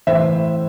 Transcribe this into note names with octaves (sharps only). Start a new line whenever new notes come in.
A2 E3 C5 E5